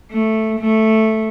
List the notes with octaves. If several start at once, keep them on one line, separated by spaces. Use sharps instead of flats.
A3
A3